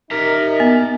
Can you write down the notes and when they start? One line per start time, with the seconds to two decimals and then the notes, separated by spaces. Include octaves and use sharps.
0.11 D#4 A#4 E5 A#5
0.60 B3